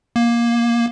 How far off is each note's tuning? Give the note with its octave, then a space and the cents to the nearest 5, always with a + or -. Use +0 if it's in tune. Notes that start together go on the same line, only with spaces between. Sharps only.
A#3 +15